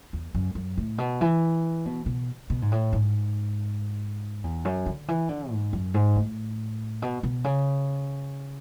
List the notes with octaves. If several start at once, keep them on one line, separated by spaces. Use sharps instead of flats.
E2
F#2
F#2
A2
B2
E3
B2
B2
B2
G#2
A2
G#2
E2
F#2
D3
E3
D3
G#2
F#2
G#2
A2
B2
B2
C#3